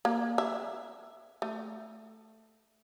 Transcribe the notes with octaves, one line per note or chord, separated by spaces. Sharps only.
A#3
E5
A3